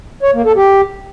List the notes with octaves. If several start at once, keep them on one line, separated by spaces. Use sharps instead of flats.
C#5
A#3
A4
G4